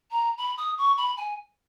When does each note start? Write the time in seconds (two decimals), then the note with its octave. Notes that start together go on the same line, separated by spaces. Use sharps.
0.11 A#5
0.38 B5
0.58 D#6
0.78 C#6
0.97 B5
1.17 G#5